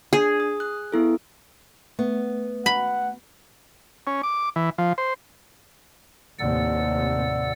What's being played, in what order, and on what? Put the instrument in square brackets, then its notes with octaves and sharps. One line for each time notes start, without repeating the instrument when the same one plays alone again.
[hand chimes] D4 [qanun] G#4
[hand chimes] D#6
F#6
B3 E4 A4
[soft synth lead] A3 [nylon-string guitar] B3
[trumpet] F#5 [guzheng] B5
[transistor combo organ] C#4
D6
E3
F3
C5
[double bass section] D#2 A2 C3 [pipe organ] D5 F#5 E6